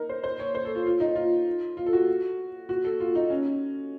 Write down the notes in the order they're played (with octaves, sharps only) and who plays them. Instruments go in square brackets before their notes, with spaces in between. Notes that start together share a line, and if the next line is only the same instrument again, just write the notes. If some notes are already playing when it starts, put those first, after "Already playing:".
Already playing: [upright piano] D#4 A#4
C5
C5
C#5
C5
A4
F4
F4
D#4
F4
F4
A4
F#4
F#4
A4
F4
D#4
C#4